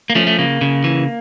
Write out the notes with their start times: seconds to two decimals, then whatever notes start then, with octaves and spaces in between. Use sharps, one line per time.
0.10 A#3
0.15 F3 A3 C#4
0.27 A3
0.39 C#3 A#3
0.61 C#3
0.84 E3